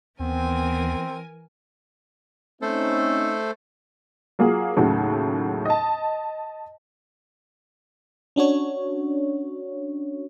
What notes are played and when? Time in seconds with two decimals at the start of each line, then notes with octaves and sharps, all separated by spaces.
0.19 D#2 E3 B3 C4 A#4 G#5
2.62 A3 C4 C#4 D#4 A4 C5
4.39 F#3 A#3 F4 G#4
4.77 D#2 A2 C#3 F#3
5.65 D#5 A5
8.36 C#4 D4 F#4 C#5